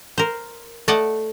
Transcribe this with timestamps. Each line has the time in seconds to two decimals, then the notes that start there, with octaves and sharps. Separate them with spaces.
0.18 A#4 C5
0.88 A3 D5 D#5 F#5 A5